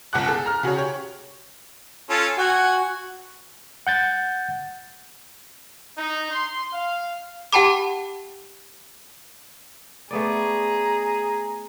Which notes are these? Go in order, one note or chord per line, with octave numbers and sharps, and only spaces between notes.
G1 C#2 F#5 D6 F#6
G#4 A4
A#5 F6
C#3 F#4 G#4 C#5
G4 C#5
C#4 F4 A4
F#4 F#5 G#5
F#5 G6 A6
D#4
C6
F5
G4 F#5 G5 A5 B5 D6
A3 B3 G#4 D5 A#5